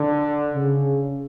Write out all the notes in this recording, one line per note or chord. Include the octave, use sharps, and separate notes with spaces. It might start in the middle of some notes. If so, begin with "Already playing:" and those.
Already playing: D3
C#3